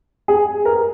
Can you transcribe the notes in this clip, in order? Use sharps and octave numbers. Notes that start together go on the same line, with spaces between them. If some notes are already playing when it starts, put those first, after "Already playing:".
G#4
A#4